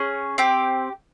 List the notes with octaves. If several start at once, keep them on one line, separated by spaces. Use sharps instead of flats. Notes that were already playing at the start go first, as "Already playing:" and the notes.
Already playing: C#4 G#4
C4 G4